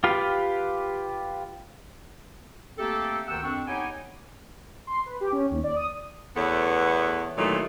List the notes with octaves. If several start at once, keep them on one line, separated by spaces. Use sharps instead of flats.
F4 G4 B4 F5
A3 A#3 C4 G4 A4
D2 D#3 F#5 G5 E6
F2 C4 D4 C#6
B3 D#4 G4 C#5 G5 G#5
C6
B4
G4
C#4
D#2
D5
D#6
E2 A3 B3 A4 C#5
A#2 D#3 E3 F#3 A3